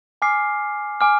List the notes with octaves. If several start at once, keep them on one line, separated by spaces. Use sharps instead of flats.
G#5 D6 F6 C7
G#5 D6 F6